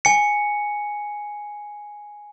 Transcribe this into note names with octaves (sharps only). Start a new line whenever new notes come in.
G#5 C#7